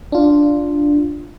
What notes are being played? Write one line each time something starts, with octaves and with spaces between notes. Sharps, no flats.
D4 F4